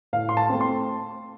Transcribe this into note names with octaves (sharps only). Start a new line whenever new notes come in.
A2 F5
C6
A5
A3 C4
C6